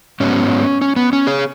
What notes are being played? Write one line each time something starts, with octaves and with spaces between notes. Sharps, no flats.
G#2 F#3 B3 C#4
C#4
B3
C#4
G#4 C#5